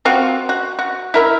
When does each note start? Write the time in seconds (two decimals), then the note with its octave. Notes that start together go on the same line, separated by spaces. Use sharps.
0.05 C4 F4 F#4
0.49 F#4
0.79 F#4
1.14 E4 A#4 E5